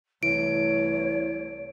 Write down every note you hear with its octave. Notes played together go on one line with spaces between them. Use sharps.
C2 E3 A3 C#5 D7